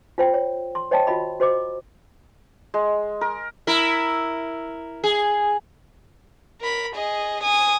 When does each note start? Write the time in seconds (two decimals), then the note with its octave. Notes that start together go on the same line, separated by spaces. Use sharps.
0.18 F4 C5 G5
0.34 C#5
0.75 C6
0.91 C5 C#5 D#5 G5 A5
1.07 F4 F#4 D#5 B5
1.40 F#4 C5 D#5 D6
2.74 G#3
3.21 A#4
3.67 E4 A#4
5.04 G#4
6.61 A#4 B5
6.95 G#4 D#5
7.43 G#5 D#6